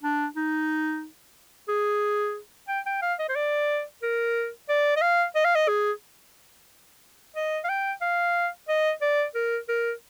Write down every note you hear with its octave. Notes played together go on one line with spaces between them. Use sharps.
D4
D#4
G#4
G5
G5
F5
D#5
C5
D5
A#4
D5
D#5
F5
D#5
F5
D#5
G#4
D#5
F5
G5
F5
D#5
D5
A#4
A#4